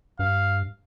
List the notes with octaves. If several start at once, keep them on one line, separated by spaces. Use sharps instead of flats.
G2 F5